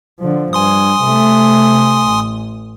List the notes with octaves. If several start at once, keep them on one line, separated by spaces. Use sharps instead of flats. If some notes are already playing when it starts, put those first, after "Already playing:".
D3 F3
G2 G#5 C6 D#6
C3 A3
A1